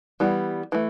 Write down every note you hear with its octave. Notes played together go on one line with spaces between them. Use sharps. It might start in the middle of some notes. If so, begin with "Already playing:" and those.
E3 G3 B3
E3 A3